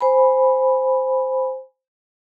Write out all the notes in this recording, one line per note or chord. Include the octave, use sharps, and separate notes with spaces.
C5 G#5 B5